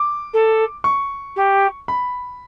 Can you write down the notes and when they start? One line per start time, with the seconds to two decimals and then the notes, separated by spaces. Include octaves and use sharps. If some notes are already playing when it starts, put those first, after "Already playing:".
Already playing: D6
0.33 A4
0.84 C#6
1.36 G4
1.88 B5